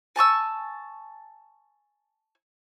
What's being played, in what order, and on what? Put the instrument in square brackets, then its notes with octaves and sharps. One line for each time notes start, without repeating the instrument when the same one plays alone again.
[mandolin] G#5 A5 C#6 E6